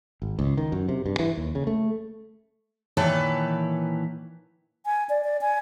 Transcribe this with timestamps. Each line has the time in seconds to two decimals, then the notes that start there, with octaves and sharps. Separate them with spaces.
0.22 G#1
0.39 C#2
0.57 D#3
0.72 F#2
0.88 C3
1.06 G2
1.19 E3
1.37 D#2
1.55 C#3
1.67 A3
2.97 A#2 D#3 E3 B4 C#5 A5
4.86 G#5
5.09 D5
5.24 D5
5.41 G#5